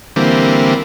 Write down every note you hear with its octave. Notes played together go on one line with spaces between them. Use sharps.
D3 E3 G3 A#3 C4